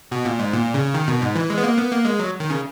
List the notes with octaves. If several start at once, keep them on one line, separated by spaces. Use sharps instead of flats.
B2
A#2
G#2
A#2
C#3
D#3
B2
G#2
E3
G#3
B3
A#3
B3
A#3
G#3
F#3
D#3
C#3